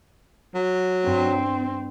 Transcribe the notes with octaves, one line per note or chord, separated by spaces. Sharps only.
F#3
G2 C4